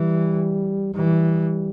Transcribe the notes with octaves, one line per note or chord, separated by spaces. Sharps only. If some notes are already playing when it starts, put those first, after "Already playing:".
Already playing: E3 G3
E3 G3